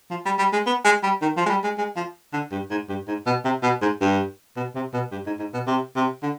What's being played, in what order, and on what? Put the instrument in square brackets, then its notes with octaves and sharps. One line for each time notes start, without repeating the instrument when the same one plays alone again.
[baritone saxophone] F3
G3
G3
G#3
B3
G#3
G3
D#3
F3
G#3
G3
G#3
G#3
F3
D3
G2
G#2
G2
G#2
B2
C3
B2
G#2
G2
B2
C3
B2
G2
G#2
G#2
B2
C3
C3
D3